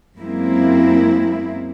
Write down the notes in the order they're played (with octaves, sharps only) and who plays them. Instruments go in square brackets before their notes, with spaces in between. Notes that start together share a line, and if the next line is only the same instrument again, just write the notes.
[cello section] F#2 F#3 G#3 A#3 C4 E4